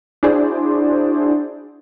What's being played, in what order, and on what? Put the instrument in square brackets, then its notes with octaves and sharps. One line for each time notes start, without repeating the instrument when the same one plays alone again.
[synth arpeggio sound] D4 E4 F#4 G#4 C5 D5